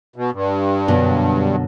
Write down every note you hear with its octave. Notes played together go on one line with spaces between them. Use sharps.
B2
G2
F#2 B2 D3